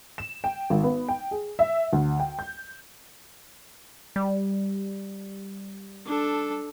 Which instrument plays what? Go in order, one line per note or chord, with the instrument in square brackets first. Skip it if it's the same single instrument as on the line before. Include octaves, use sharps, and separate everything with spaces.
[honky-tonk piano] E7
G5
G#1
B3
G5
G#4
E5
D2
G5
G6
[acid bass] G3
[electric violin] D4 A4